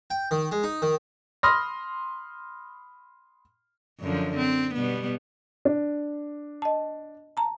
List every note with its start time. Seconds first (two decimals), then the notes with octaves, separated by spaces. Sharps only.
0.10 G5
0.31 D#3
0.52 G#3
0.63 D#4
0.82 D#3
1.43 B5 C6 D#6 F6 A#6
4.01 F#2 D3 F3
4.37 C4
4.75 B2 G3 B3
5.65 D4
6.62 D#5 A5
7.37 A5 A#5